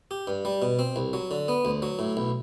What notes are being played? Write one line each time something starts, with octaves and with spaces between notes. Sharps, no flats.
G4
G2
G3
B2
C4
C2
F#3
D3
B3
D2
F#3
A2
B1